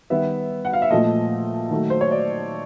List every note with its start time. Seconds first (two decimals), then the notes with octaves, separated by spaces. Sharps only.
0.10 D#3 G3 B3 E5
0.65 F#5
0.73 F5
0.82 E5
0.90 A#2 F3 A3 D#5
1.70 D#3 F#3 A3
1.90 C5
2.01 C#5
2.11 D5